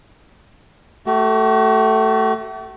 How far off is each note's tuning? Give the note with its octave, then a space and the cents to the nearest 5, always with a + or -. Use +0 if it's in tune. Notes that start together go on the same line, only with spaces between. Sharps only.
A3 +5 F#4 +45